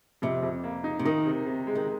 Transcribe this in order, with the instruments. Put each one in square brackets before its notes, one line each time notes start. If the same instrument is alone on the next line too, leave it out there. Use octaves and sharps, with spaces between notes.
[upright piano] F2 [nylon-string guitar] C3
[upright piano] F2
A#3
D#4
[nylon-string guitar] C3
[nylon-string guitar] D#3 [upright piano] D#4
[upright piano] C3
C3
G#3
[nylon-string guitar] D#3